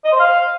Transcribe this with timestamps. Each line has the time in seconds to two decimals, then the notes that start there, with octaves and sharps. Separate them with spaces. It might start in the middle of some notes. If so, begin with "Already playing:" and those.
0.05 D#5
0.12 C5
0.20 F5